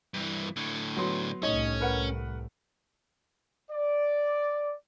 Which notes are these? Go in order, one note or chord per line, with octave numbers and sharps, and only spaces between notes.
G2 E3
A2 D3
F#3 B3 C6
C2 A2 A3 C#4 D#4 C#5 D#5
A#4 B4 F#5
D5